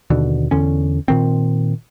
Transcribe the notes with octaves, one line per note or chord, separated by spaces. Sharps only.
D#2 B2 D3
E2 D3 C#4
A#2 D#3 C4